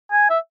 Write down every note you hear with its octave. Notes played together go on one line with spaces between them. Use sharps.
G#5
E5